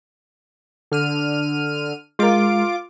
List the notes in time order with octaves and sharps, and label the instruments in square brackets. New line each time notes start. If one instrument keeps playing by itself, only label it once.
[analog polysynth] D3 F6 D#7
[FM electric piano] G#3 A#4 [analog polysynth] F4 D6